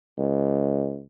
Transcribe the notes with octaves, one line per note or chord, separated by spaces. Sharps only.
C#2